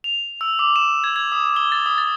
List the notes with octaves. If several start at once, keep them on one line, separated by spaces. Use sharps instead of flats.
F7
E6
D6
E7
G#6
G#6
D#6
G7
A6
D#6
A6